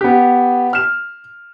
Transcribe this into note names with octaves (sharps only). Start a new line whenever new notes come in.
B3 G4
F6 E7